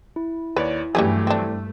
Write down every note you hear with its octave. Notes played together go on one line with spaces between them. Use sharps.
E4
D#2 B4 C#5 D5
G2 E3 F#3 G3 A3 C#4 G4 G#4
C4 D4